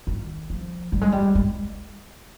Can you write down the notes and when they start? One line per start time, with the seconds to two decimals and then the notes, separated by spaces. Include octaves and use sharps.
0.07 D#3
0.50 F3
0.92 G3
1.01 G#3
1.12 G3
1.35 G#3